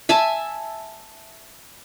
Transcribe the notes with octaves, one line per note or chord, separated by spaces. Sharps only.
E5 G#5 A5